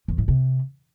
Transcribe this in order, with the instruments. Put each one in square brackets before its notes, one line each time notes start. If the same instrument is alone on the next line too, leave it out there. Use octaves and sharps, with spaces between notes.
[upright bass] E2
A2
C3